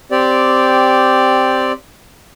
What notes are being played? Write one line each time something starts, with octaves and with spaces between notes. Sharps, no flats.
C4 G4 D5